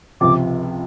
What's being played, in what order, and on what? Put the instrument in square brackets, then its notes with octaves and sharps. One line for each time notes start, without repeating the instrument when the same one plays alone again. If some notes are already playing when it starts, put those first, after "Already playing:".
[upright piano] C#2 C3 F3 [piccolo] D6